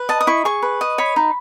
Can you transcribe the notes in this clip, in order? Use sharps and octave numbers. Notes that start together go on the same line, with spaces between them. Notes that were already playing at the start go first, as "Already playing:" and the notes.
Already playing: B4
D#5 A5
D#6
E4 C#6
G#4 C#6
B4
D#5
C#5 B5
D#4